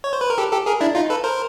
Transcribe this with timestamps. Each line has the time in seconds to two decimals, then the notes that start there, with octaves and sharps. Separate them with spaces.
0.04 C#5
0.13 C5
0.21 B4
0.30 A#4
0.38 G4 A4
0.52 G4 A4
0.66 G#4 A#4
0.81 D4 E4
0.95 D#4 F4
1.10 A4 B4
1.24 A#4 C5